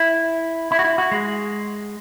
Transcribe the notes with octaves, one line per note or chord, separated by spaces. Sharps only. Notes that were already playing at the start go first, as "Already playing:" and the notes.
Already playing: E4
E4
F#4
E4
F#4
G#3